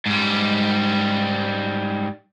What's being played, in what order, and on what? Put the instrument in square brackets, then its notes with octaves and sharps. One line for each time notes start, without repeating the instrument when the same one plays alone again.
[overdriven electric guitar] G#2 G3